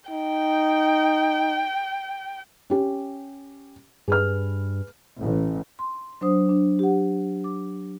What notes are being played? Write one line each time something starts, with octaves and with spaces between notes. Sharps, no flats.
D#4 G5
C#4 G4
G2 G#4 B4 F6
A1
C6
F#3 D4 C5 D#6
D4
G4 F#5
D6